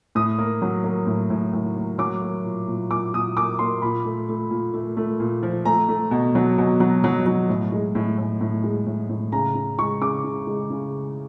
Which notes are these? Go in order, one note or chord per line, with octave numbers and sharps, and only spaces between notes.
A2 D#6
A#3
F#3
A#3
A2
A2
A2
A#3
F#3 D6
A#3
A#2
A#2
A#2 D6
A#2 D#6
A#3 D6
A#3 C6
A#2 B5
A3
A3
A#2
A3
A3
A#2
F3
A3 A#5
A3
B2
F#3
B2
F#3
F#3
F#3
A2
G#3
A2
A2
A2
G#3
A2
A2
C#3 A#5
C#3
G#3 C#6
C#3 D6
C#3
G#3
C#3